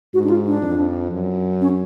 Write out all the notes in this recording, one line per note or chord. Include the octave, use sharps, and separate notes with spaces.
G#2 F#4
D4
F4
D4
F2
F#2
C#4